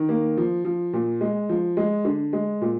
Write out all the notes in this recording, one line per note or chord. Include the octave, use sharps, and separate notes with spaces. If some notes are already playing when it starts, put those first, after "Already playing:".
Already playing: D#3
A#3
F3
F3
A#2
G#3
F3
G#3
D3
G#3
A#2